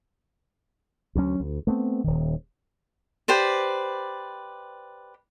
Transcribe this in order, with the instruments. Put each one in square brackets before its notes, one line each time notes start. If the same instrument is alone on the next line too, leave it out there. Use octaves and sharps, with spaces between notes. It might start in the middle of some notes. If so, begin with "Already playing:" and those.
[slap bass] D2 F#3 C#4
D2
A3 B3 C4
D#1 D#3
[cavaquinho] G4 B4 C5 D5